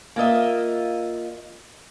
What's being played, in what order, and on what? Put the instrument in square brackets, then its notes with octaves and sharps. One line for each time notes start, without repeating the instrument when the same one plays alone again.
[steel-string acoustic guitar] A#3 F4 D#5 E5